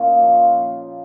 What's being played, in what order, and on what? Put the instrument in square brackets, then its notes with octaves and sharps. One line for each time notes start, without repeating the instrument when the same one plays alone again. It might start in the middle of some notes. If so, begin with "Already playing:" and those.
Already playing: [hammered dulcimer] A#2 C#4 D#4 F4
F3